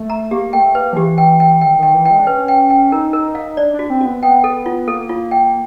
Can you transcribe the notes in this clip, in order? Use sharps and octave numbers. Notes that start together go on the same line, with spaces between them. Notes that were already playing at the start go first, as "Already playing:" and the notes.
Already playing: A3
A#5
A#3 G4
A3 G5
A#3 B4
F3
E3 G4
G5
G5
D#3 G5
D#3 G5
E3
G5
G#3
D4
C#4 B4
G5
G5
D#4 A#4
A#4
F5
D4 D5
D4
F#4
C4
B3 F#4
B3 G5
A4
F4
A#3 A4
F4
G5